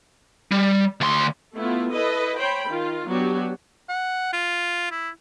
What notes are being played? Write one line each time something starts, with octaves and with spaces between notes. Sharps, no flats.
G3
D2 C6
A3 B3 E4 F4
E4 A4 B4 D#5
C5 C#5 G5 B5
D#3 F4
F#3 B3 D4 F#4 G4
F#5
F4
E4